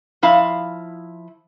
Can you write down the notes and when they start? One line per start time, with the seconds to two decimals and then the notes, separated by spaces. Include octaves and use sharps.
0.22 F3 E4 F5 A#5